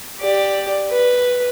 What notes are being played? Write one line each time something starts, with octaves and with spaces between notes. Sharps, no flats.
G4 D5
B4